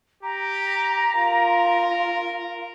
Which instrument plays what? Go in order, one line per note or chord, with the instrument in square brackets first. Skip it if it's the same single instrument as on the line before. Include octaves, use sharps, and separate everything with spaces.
[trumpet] G4 [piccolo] A#5
[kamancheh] F4 [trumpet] A#4